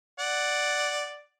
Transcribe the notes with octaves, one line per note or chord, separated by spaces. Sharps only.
D5 F#5